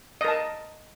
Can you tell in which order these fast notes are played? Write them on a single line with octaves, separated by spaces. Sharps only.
D#5 A#4 A5